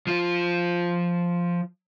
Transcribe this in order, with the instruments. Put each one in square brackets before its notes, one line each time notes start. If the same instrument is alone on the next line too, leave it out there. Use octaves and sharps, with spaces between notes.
[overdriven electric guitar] F3 F4